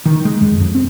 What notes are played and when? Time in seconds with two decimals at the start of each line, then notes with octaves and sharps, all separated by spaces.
0.06 D#3
0.25 G#3
0.41 F#2
0.60 F2
0.75 C4